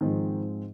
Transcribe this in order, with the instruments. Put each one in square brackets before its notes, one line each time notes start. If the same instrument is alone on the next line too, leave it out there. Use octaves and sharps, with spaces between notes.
[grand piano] G#2 F3 G#3 C4 D#4 [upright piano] D#3